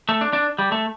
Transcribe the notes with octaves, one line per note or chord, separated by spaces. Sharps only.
A3
D4
D4
G3
A3